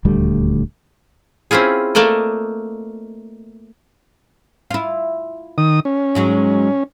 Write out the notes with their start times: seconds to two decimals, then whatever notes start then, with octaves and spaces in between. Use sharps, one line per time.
0.05 D#1 D2 G3 A3
1.51 C4 C#4 E4 F4 G#4
1.95 A3 A#3 A4 D5 D#5
4.71 E4 F4
5.58 D#3 D#6
5.85 C#4
6.15 G#2 F#3 G#3